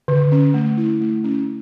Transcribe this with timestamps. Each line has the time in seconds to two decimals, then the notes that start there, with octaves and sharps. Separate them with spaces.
0.08 D3
0.32 C#4
0.54 A3
0.77 E4
1.01 A3
1.24 C#4